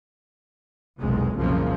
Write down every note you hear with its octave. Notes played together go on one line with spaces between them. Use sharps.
F1 B1 E2 C3 G#3
C2 F#2 A#2 C#3 F3 A#3